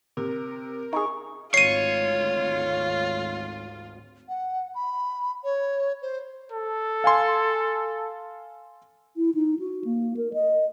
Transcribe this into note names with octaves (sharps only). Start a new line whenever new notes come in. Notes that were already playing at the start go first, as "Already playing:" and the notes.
C3 A#4
D#4 G#4 C#6
G#1 D2 F4 C#5 C7 D#7
F#5
B5
C#5
C5
A4
F5 G#5 C6
E4
D#4
F#4
A#3
A#4
D#5